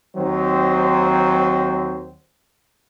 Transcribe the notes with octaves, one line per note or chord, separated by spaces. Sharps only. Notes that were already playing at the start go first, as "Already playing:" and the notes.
D#2 D#3 F#3 C4 C5